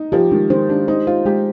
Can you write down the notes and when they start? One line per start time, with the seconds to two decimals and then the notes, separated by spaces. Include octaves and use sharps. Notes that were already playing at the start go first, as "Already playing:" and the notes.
Already playing: D#4
0.12 F3 G4
0.32 D#3 G#3
0.50 D#3 C5
0.69 D4 G4
0.88 D#4 C5
1.07 F4 C5
1.26 G#3 G4